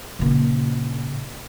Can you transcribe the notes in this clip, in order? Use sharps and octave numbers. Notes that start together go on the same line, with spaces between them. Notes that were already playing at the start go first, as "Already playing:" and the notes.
A#2 C#3